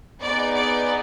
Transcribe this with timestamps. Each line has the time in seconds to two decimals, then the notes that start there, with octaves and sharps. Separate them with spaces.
0.21 B3 D#4 G#4 D5
0.54 D5